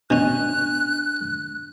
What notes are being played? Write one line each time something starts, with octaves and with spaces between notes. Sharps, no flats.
B2 C#4 D4 F#6